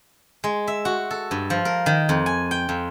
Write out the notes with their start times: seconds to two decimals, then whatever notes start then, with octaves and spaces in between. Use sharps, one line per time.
0.44 G#3
0.68 E5
0.85 F#4
1.11 A4
1.31 G2
1.50 F3
1.65 A#4
1.86 D#3
2.09 F2
2.26 G#5
2.51 G5
2.69 F2